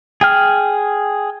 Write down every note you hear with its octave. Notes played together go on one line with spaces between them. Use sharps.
G#4 G5 F6